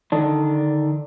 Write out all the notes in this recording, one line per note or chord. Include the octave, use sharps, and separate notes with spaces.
D3 D#3 D4